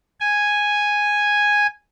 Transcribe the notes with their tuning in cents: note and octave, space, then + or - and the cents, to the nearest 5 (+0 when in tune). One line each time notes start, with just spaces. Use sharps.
G#5 -5